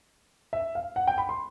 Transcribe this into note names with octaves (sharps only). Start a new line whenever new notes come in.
E5
F5
F#5
G5
B5
C6